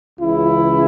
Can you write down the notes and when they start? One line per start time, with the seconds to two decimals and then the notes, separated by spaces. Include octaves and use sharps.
0.19 C#2 C#3 E3 E4